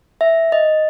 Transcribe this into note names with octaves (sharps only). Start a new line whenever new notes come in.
E5
D#5